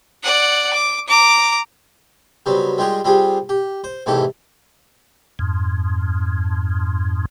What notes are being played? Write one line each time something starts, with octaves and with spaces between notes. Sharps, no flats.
D5 F#5
D6
A#5 D6
C#3 F#3 G3 B3 C4
G3 G#3 F4 G4 G#4 A#4
G3 C4 F4 G4 G#4
G4
C5
A1 E2 G#2 C3 G4 A4
F2 G#2